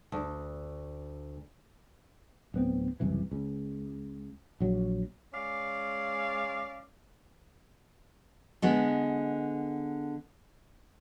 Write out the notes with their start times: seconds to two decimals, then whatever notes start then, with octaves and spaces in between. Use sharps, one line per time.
0.12 D2
2.54 D1 B3 C4
3.00 F#1 C2 E3
3.31 C#2
4.60 A#1 F#3
5.33 G#3 C#4 D5 F5
8.62 D3 G#3 B3